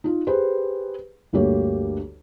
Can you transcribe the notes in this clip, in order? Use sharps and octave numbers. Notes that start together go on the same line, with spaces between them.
D#4 F4
G4 G#4 B4 C5
G1 D2 A#3 G4 C#5